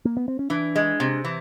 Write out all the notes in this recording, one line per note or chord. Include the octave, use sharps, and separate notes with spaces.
A#3
B3
C4
C#4
E3 D4
G#3
C3
E3